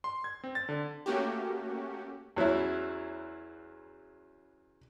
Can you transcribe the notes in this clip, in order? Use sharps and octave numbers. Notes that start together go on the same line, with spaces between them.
C6
G#6
C4
A6
D3
A3 A#3 C#4 F#4 G4
E2 F#3 C#4 E4